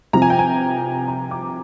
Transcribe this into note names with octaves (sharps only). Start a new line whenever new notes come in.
C3 F3 A#5
G#5
G5
G#5
A#5
D6